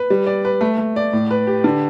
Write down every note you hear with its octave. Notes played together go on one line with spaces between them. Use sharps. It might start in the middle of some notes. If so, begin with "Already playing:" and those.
Already playing: B4
G3
D5
B4
A3
A3
D5
A2
B4
G4
D3